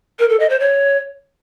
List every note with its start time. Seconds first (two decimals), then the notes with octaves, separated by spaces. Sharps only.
0.19 A#4
0.29 A4
0.40 D#5
0.50 C5
0.60 C#5